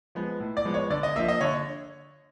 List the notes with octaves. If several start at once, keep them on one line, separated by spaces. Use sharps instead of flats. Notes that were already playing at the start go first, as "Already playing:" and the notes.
F3 G#3 B3
A2
D5
F3 G#3 B3
C#5
D3 D5
D#5
F3 A#3 E5
D#5
D3 C#5